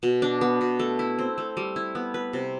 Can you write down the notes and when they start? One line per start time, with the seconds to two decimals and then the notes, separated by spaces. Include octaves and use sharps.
0.03 B2
0.22 D4
0.41 B3
0.61 B2
0.79 A3
0.99 E4
1.19 C4
1.38 A3
1.57 G3
1.76 E4
1.95 B3
2.14 B4
2.33 C3